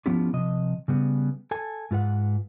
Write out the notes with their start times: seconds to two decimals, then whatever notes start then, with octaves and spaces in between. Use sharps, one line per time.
0.06 F3 B3 C#4 E4 F4 G4
0.33 C3 F3 D#5
0.88 C#3 G3 B3
1.51 A4 G#5 A5
1.91 G#2 F4 B4 F#5